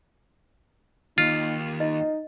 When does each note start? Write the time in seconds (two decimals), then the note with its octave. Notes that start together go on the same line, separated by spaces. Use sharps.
1.18 D#2 D#4 F4
1.80 D#4 D#5